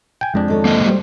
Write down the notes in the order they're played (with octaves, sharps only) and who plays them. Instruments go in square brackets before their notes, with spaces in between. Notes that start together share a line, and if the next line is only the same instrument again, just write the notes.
[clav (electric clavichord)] G5 G#5
[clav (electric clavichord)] F2 D4 [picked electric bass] G#3
[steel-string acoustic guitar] D#3 A4 C#5
[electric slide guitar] A#3 C4 D#5
[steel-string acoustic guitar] G3 G4 C5